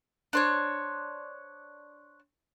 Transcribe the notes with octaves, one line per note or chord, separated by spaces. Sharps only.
D4 C5 C#5